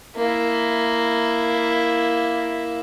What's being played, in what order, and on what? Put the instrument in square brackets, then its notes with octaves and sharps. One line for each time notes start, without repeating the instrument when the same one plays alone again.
[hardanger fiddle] A#3 E4